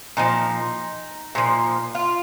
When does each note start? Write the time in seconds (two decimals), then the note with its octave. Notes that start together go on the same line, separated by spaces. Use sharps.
0.17 A#2 F3 D#4
1.35 A#2 F3
1.95 F4